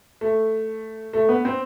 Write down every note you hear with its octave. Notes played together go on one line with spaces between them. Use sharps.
A3
A3
B3
C4